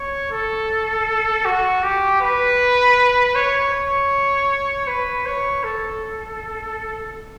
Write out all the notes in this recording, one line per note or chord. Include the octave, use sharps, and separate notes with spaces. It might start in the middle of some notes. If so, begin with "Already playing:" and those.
Already playing: C#5
A4
F#4
G4
B4
C#5
C#5
B4
C#5
A4